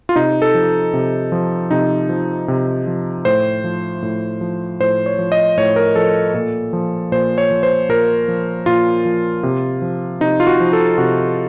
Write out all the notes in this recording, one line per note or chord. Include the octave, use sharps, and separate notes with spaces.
F4
C3 D#4
A4
F3
C3
F3
C3 D#4
F3
C3
F3
A2 C5
F3
A2
F3
A2 C5
C#5
F3
D#5
A2 C#5
A#4
F3 A4
A#2 A4
F3
A#2 C5
C#5
F3
C5
A#2 A#4
F3
A#2 F4
F3
C3
F3
C3 D#4
F4
F#4
F3
A4
C3 F#4